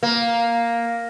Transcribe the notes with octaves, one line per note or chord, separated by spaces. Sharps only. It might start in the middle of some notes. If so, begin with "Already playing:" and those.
A#3